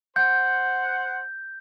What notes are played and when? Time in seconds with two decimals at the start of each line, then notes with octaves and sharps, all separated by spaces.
0.16 C5 F#5 G6